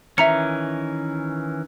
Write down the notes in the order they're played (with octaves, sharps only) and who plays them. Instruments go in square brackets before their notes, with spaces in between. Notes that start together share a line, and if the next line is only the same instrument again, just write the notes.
[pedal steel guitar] D#3 E3 C#4 [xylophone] E5 A#5 C#7